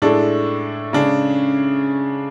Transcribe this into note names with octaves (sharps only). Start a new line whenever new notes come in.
A2 G#3 D4 A4
C#3 G#3 D4 G#4